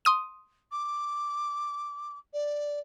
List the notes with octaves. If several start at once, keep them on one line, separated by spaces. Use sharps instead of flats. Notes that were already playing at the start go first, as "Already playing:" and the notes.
C6 D#6 D#7
D6
D5